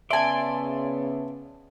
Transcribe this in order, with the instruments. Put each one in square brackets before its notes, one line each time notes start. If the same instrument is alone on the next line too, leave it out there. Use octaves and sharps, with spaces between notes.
[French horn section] C#3 B3 [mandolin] D5 G#5 [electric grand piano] E5 A5 [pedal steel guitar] C6 D6